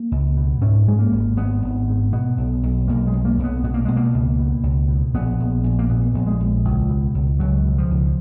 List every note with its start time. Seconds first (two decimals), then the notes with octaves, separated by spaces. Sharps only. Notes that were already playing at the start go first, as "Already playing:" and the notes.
Already playing: A#3
0.11 C#2
0.36 B2
0.61 G#2 C#4
0.87 G#2 G#3
0.99 A#3
1.12 G#1
1.37 G#1 B3
1.62 G#1
1.88 G#2
2.13 B2 B3
2.37 B1
2.63 B1
2.88 B1 A#3
3.07 G#3
3.13 B1
3.25 A#3
3.38 B1
3.44 B3
3.64 B2 B3
3.74 A#3
3.85 B2 G#3
3.97 A#3
4.14 C#2
4.39 B2
4.63 C#2
4.88 B2
5.13 A#1 B3
5.40 A#1
5.64 A#1
5.79 A#3
5.89 A#2 B3
6.14 A#1
6.27 G#3
6.40 A#1
6.65 C#2
6.89 B2
7.14 C#2
7.39 C#2 F#3
7.65 B2
7.78 F3
7.90 C#2